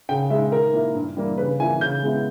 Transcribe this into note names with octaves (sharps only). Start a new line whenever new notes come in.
C#3 G5
G#3 D#4 E5
D#3 A#4
A#3 E4
G2
E3 G3 A#3
C#3 B4
E3 A#3 E4 G#5
C#3 G6
G#3 B3 E4